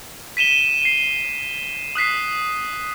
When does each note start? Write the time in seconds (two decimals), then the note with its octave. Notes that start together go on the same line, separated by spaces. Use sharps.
0.37 B6 D#7 E7 G7
0.82 C7 D#7
1.95 D#6 F#6 B6 C7